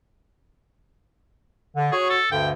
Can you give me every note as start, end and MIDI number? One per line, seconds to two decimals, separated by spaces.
1.76 1.91 50
1.92 2.19 66
1.92 2.06 68
1.92 2.19 73
2.10 2.29 69
2.31 2.52 38
2.31 2.52 43
2.31 2.52 50
2.31 2.48 79